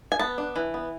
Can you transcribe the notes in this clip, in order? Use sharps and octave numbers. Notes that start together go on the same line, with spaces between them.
G#5
B3 A5
D4
E3
B3